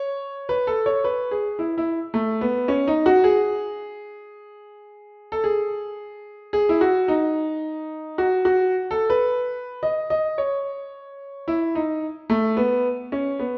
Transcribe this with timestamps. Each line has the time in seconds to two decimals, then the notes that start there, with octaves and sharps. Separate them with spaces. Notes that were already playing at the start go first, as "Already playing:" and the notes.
Already playing: C#5
0.49 B4
0.67 A4
0.86 C#5
1.04 B4
1.31 G#4
1.59 E4
1.78 E4
2.14 A3
2.41 B3
2.68 C#4
2.87 D#4
3.06 F#4
3.24 G#4
5.32 A4
5.44 G#4
6.53 G#4
6.69 E4
6.81 F#4
7.08 D#4
8.18 F#4
8.45 F#4
8.91 A4
9.10 B4
9.83 D#5
10.10 D#5
10.38 C#5
11.48 E4
11.75 D#4
12.30 A3
12.57 B3
13.12 C#4
13.39 B3